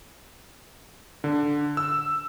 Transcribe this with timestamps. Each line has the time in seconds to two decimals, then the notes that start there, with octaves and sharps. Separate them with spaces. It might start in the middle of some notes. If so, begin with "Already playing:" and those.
1.24 D3
1.77 E6